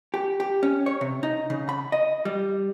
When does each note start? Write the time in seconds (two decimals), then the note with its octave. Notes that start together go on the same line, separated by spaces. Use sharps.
0.14 G4
0.40 G4
0.63 C#4
0.86 C#5
1.01 C3
1.23 D#4
1.50 C#3
1.69 B5
1.92 D#5
2.25 G3